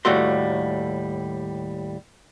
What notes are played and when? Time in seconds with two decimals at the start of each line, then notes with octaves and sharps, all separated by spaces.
0.05 D#2 A2 G3 A3 F#4 C6